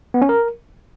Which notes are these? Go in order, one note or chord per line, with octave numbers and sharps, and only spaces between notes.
B3
C#4
A#4